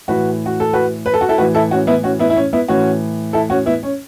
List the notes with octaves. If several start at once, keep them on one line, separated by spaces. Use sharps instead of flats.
A2 E3 F#4 B4
F#4
A4
F#4 B4
B4
A4
F#4
E4 A4
A2 E3 F#4 B4
E4 A4
C#4 F#4
B3 E4
C#4 F#4
B3 E4
E4
C#4
B3 E4
A2 E3 C#4 F#4
E4 A4
C#4 F#4
B3 E4
C#4